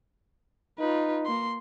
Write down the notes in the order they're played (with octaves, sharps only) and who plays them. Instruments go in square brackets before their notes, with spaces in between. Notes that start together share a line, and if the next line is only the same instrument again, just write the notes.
[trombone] D#4 [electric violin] F4 B4
[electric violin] A#3 C6